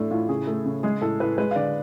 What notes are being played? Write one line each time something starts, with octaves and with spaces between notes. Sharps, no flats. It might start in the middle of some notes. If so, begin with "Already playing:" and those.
Already playing: A2 A3 D4
A2 F4
C#3 G#4
A3
C#3
G#3 G#4
A2 A4
A2 B4
G#3 B4
F5
D3 D5